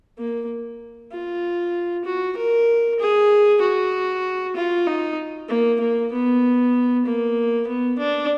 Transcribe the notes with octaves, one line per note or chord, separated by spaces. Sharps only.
A#3
F4
F#4
A#4
G#4
F#4
F4
D#4
A#3
A#3
B3
A#3
B3
D4